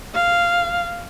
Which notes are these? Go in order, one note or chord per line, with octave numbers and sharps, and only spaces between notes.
F5